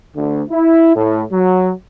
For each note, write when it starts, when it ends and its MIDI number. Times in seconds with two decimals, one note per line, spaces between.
0.16 0.42 38
0.50 0.93 64
0.96 1.23 45
1.31 1.72 54